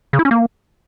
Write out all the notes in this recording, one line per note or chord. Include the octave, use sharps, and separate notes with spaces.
C#3
E4
C#4
A#3